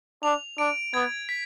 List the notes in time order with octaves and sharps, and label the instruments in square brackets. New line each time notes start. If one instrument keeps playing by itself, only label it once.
[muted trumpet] D4 [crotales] F7
[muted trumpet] D4 [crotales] D7
[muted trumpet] B3 [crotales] G#6
[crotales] B6